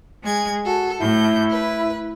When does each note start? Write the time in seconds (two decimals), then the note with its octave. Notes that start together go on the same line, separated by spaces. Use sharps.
0.24 G#3 G#4 G#6
0.66 F#4 A4
1.01 A2 E4 G6
1.50 B4